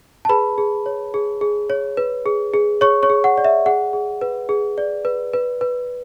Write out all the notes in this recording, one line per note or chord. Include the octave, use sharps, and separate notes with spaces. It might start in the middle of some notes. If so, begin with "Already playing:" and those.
A5
G#4 B4 B5
G#4
C#5
G#4
G#4
C#5
B4
G#4
G#4
G#4 C#5 C#6
C#5 C#6
G#4
F#5
D5
E5
G#4 F#5
G#4
B4
G#4
D5
B4
B4
B4